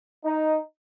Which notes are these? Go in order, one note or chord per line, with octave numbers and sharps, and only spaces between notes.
D#4